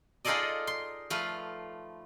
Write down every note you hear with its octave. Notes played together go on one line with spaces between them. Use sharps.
D#4 F4 G#4 A4 D5 D#5
C6
F3 A3 F4 B4